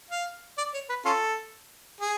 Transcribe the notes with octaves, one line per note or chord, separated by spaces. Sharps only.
F5
D5
C#5
B4
C#4 F4 A4
G#4